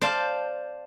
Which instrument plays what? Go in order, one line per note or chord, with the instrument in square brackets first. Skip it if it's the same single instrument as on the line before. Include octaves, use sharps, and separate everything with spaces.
[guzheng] C5 D5 F5 A5